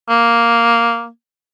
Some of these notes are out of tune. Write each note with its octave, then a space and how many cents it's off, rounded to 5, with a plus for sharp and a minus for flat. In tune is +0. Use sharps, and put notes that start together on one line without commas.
A#3 +0